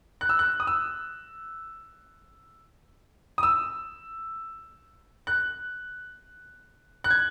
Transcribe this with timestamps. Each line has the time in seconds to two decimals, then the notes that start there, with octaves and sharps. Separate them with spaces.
0.21 F#6
0.29 E6
0.39 F#6
0.60 D#6
0.67 E6
3.38 D#6
3.43 E6
5.27 F#6
7.04 F#6
7.11 G#6